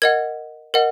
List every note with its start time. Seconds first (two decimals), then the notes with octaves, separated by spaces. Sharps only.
0.02 A#4 D#5 F#5 G#6
0.74 A#4 D#5 F#5